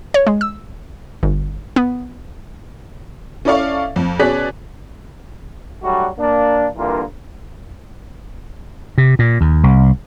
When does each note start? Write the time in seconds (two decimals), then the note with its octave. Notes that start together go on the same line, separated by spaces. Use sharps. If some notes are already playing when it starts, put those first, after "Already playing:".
0.14 C#5
0.27 G#3
0.41 E6
1.23 G1
1.76 B3
3.45 C#4 E4 A4 D5 F5 C#6
3.96 F2
4.19 B2 C#4 G#4 D5 F#6 B6
5.83 F#3 G3 A3 D4 F#4
6.18 A#3 D4
6.76 G2 D3 E3 A#3 F4 A#4
8.98 C3
9.19 A#2
9.41 D#2
9.63 C2